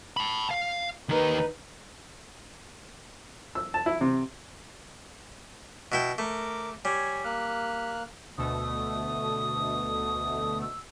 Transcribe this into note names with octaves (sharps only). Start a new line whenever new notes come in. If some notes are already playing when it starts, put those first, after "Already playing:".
A5 B5
F5
D#2 D#4 A#4 B4
E6
A5
E4
C3
B2 E4 G5
A3 A#4 D6
G3 C#5 G#5
A#3 F6 F#6
D2 B2 A3 D#6
E6